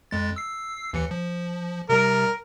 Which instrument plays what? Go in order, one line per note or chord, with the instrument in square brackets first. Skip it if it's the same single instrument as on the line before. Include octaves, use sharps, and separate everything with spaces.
[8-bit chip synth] F2 G#3 A6
E6 C7
D#2 E3 C#7
F3
[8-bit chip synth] C3 G3 [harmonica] A#4